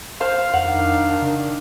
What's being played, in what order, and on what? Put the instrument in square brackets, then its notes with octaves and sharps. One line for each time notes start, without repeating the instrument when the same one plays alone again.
[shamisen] C5 [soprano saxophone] F5
[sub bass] F2 [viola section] D#3 D4 [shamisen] F#5
[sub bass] C#3